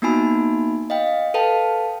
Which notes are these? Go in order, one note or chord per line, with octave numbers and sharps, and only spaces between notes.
A#3 B3 D#4 F#4 G#5 B5
D#5 F5 G5
A4 B4 F5 G5 A5